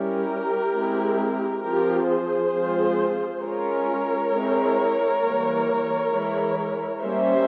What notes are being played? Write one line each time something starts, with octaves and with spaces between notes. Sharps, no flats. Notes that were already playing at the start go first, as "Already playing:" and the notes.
Already playing: G3 C#4 E4 G4 A#4
G#3 C4 E4
F3 C4 F4 G4 A#4
G#4 C5
F3 G#3 C4 F4
G#3 C#4 F4 A#4 C#5
G#3 C4 E4
E3 G3 A#3
E3 G#3 E4
G3 A#3 C#4 C5 E5